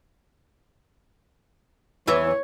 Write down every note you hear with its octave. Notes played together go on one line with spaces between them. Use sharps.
E2 E3 C#5 E5